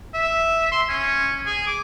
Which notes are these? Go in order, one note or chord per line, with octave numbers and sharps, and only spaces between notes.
E5
C6
C#4
G#4
D6